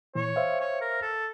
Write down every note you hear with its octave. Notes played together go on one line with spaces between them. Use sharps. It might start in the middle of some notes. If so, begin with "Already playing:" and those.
A#2 E3 C#5
C5 E5 F5
C#5
A#4
A4